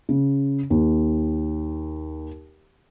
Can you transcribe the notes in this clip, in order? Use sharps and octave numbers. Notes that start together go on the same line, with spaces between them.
C#3
D#2